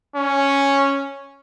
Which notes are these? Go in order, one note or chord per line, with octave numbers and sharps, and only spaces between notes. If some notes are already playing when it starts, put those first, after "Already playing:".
C#4